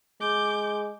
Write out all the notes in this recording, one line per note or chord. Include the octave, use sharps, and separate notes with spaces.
G#3 D6 G6